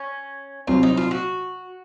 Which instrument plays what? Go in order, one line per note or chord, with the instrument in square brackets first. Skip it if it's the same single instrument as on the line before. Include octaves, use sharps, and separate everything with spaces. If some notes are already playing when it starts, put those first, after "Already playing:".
Already playing: [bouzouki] C#4
[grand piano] C2 C3 F#3 C4 [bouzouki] F4
[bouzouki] D#4
F4
F#4